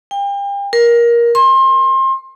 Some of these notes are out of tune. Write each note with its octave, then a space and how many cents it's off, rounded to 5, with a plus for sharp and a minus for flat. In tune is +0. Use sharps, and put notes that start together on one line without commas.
G5 +40
A#4 +15
C6 +30